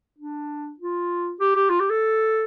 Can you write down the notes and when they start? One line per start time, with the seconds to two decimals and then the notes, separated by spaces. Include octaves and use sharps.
0.19 D4
0.80 F4
1.40 G4
1.56 G4
1.70 F4
1.80 G4
1.90 A4